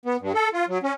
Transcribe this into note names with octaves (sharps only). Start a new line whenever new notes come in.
B3
G2
A4
F4
F#3
C#4